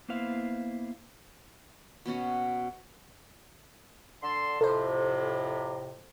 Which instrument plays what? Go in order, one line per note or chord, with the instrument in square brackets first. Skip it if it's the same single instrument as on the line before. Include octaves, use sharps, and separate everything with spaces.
[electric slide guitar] A#3 B3 E4 C5 F5
[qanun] B2 B3 C#4 F#4
[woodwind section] D3 A5 C6
[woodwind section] F2 A2 C3 [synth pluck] A4 C5